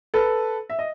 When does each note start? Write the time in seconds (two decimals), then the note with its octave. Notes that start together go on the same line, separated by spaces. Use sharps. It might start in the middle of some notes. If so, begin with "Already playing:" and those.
0.14 A4 B4
0.70 E5
0.79 D#5